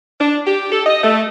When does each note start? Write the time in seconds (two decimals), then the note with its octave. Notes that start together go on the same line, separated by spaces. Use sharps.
0.20 D4
0.47 G4
0.72 A4
0.86 D#5
1.04 A3